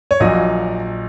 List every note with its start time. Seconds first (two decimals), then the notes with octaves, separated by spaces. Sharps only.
0.11 C#5
0.20 A#1 A#2 F#3 D#5